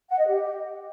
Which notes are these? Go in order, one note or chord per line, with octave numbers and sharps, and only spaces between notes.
F#5
D#5
G4